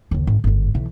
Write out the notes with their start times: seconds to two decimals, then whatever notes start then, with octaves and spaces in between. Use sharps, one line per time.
0.11 F#1 D#2
0.27 G#1
0.44 G1 G#2
0.75 B1 E3